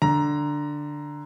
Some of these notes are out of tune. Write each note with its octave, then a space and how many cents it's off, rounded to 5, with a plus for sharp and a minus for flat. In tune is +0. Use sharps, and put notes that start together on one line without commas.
D3 +5 A#5 +10